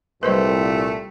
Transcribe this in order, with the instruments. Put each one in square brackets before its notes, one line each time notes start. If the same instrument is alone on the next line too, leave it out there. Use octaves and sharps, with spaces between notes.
[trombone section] C2 A#2 [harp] G3 C6 [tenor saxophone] A3 [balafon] B4 C5 D#5